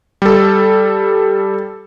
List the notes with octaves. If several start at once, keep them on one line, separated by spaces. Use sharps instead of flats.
G3 A4